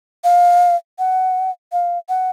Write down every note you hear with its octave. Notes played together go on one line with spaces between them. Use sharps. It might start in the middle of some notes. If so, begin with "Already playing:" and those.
F5
F#5
F5
F#5